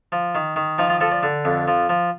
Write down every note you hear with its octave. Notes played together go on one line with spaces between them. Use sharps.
F3
D#3
D#3
F3 D#4
F4
F3 A4
D5
D3
F2
F3
F3